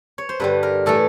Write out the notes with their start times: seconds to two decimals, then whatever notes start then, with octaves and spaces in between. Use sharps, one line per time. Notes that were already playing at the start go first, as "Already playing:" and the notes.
0.18 C#5
0.29 C5
0.40 G2 D3 G3 B4
0.63 A#4
0.86 A2 E3 A3 A4